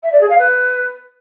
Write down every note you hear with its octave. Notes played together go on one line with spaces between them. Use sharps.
E5
D5
G#4
F5
B4